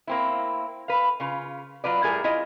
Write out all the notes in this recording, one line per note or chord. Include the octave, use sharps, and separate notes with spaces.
A#3 C4 E4
B4 F5
C#3 F4
F#3 F4 B4 D5
A2 G3 E4 G#4 A#4
E4 F4 D#5